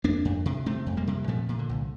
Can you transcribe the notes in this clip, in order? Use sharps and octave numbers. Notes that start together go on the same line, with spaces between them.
F2 A#3 D4
F2
C3
C3 A3 C4
F2
G3 A#3
C3
A#2 F3 A3
A#2
D3
C2